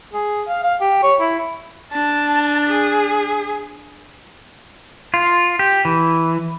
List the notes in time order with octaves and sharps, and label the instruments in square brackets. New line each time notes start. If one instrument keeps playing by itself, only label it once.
[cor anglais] G#4
F5
F5
G4
C#5
E4
[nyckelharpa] D4 [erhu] A5
[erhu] G#4
[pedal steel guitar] F4
G4
E3